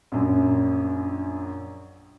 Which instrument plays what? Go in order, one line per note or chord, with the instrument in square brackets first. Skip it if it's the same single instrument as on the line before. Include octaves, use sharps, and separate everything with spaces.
[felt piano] A#1 F#2